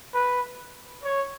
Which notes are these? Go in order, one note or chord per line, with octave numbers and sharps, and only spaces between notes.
B4
C#5